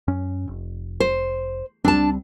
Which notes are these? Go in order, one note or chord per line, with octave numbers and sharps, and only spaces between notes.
F#2 C#4
F1
C5
C#2 G3 C4 D4 A5